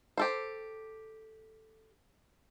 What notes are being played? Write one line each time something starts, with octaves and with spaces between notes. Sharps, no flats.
G4 A4 C5